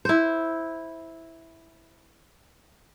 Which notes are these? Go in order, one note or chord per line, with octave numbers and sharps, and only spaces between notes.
E4 C5